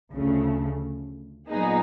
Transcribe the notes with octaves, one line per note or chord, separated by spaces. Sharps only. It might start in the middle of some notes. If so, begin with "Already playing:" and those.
D2 C#3 F3 A3
A#2 F#3 B3 D#4 G#4